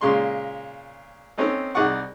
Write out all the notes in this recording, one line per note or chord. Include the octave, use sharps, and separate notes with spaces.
A#2 C#3 G#3 C6 C#6
C4 C#4 D#4 A4
C2 D#4 G#4 D5 F#5 C#6